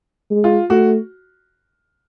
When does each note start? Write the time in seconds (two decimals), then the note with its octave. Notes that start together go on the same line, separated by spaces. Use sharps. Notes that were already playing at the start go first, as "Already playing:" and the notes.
0.31 G#3
0.44 F4
0.70 A3 F#4